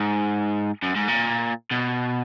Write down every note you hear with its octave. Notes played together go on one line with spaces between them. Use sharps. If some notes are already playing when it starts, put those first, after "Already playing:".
Already playing: G#2
F#2
G#2
A#2
B2